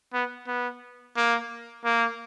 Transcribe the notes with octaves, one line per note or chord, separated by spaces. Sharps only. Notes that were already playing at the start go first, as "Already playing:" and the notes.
B3
B3
A#3
A#3